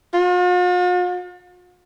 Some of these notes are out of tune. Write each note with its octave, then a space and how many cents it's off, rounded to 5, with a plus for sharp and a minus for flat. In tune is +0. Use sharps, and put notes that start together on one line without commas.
F4 +45